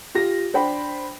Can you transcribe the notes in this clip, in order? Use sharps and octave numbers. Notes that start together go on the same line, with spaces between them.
F4 G4 A#6
D4 C5 G5 B5